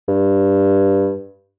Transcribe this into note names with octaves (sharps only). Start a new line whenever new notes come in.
G2